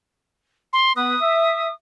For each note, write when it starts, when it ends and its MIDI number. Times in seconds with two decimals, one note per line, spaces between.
0.73 0.93 84
0.96 1.15 59
0.96 1.15 71
0.96 1.73 87
1.21 1.67 76